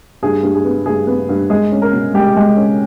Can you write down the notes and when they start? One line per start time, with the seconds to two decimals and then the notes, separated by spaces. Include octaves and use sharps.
0.23 G2 G#4
0.43 G2
0.55 G#4
0.65 B3
0.86 G2 G#4
1.07 B3
1.29 G2
1.50 G#3 G#4
1.72 C#4
1.82 A#4
1.93 B2
2.14 G#3 G4
2.36 G#3
2.57 C#4